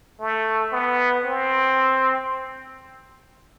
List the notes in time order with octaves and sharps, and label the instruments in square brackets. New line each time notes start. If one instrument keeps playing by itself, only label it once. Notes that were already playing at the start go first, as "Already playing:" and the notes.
[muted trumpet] A3
B3
C4